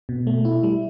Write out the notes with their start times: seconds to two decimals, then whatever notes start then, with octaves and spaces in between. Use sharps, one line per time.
0.09 B2
0.27 A3
0.45 E4
0.63 G3